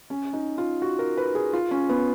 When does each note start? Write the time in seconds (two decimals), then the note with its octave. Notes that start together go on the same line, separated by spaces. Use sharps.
0.10 C#4
0.33 D#4
0.58 F4
0.82 F#4
0.99 A#4
1.17 B4
1.35 G#4
1.53 F4
1.71 C#4
1.89 B3